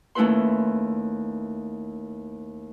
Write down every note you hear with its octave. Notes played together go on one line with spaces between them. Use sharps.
D#2 A3 C#4 E4 B4 C6